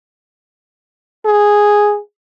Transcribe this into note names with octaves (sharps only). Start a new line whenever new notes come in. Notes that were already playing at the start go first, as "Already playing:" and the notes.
G#4